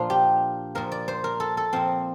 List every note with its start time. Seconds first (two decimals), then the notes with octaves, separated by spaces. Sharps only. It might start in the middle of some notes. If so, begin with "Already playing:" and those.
Already playing: A#2 F3 D4 F4
0.10 G4
0.75 A#2 F3 A#4
0.92 D5
1.08 C5
1.24 A#4
1.40 A4
1.57 A4
1.73 A#2 F3 C4